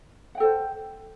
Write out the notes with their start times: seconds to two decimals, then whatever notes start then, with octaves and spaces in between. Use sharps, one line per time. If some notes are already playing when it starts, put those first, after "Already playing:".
0.35 F#5
0.38 G5
0.40 A4
0.43 C5